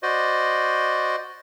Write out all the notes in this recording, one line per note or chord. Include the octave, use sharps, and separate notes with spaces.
F#4 C5 D5 D#5